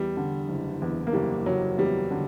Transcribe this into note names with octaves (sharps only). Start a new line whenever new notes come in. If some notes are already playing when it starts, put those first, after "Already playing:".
Already playing: E2 G3
D3
F#1
E2
A#3
F#1 G3
F#1 F#3
E2 G3
D3